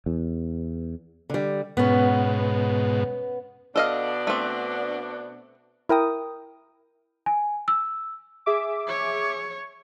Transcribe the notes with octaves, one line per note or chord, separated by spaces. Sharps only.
E2
D3 G3
G#2 B2 B3 C#4
B2 B3 D4 A4 D#5 F5
A3 C4
E4 A#4 G5 D#6
G#5
E6
G#4 E5 D6
C#5